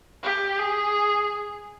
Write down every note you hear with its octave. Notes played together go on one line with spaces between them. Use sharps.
G4
G#4